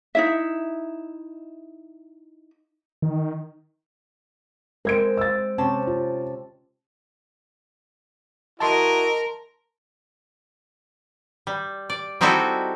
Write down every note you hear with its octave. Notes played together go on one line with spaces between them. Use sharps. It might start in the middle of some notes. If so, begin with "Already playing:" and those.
D#4 E4 E5
D#3
G#3 C4 A#4 G#6 D7
E6 A6
C3 C4 C#4 A5
F4
E4 F#4 A#4 D#5 A5 C6
G3
D5
G3 C4 D#4 E4 F#4 A4